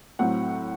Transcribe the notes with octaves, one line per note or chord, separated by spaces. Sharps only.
A2 F#3 C4 F#5